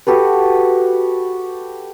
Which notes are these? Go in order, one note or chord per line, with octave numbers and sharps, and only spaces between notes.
F#4 G4 A4 B4